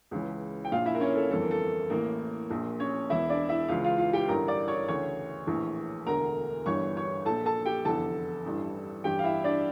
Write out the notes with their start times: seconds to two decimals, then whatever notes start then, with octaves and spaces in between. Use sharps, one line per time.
0.11 C#2 C#3 E3
0.65 G5
0.72 A#1 A#2 F4 F5
0.86 E4 E5
0.95 A#4
1.01 C#4 C#5
1.15 A4
1.31 G1 F2 E3 A4
1.41 A#4
1.51 A4
1.90 A1 A2 E3 A#3 A#4
2.51 A#1 A#2
2.80 C#4 C#5
3.10 E1 E2 E3 E4 E5
3.30 D4 D5
3.49 E4 E5
3.68 C#2 C#3 E3 F4 F5
3.84 F4 F5
3.98 F4 F5
4.13 G4 G5
4.28 A1 G2 D3 A#4 A#5
4.48 D5 D6
4.68 C#5 C#6
4.88 D2 C#3 E3 C#5 C#6
5.47 A#1 A2 E3
6.06 E1 D2 D3 A#4 A#5
6.66 G1 G2 E3 C#5 C#6
6.97 C#5 C#6
7.25 A#1 A#2 A4 A5
7.45 A4 A5
7.66 G4 G5
7.85 F1 E2 D3 A4 A5
8.45 A1 G2 E3
9.04 A1 G2 E3 G4 G5
9.19 F5
9.24 E4 E5
9.44 D4 D5